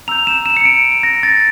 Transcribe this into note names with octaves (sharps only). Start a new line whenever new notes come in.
A#5 E6 G6 F7
E7
E7
C#7
D7
A#6
A6